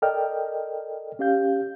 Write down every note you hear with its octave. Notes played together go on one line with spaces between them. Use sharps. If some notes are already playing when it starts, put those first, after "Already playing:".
A4 A#4 D5 D#5 G5 F6
C#4 G4 F5 G6